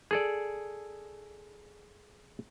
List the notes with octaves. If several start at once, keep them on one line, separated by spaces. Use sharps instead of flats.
G#4 A4 D5